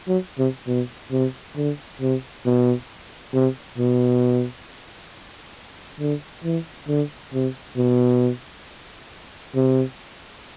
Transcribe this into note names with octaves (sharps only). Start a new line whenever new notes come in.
F#3
C3
B2
C3
D3
C3
B2
C3
B2
D3
E3
D3
C3
B2
C3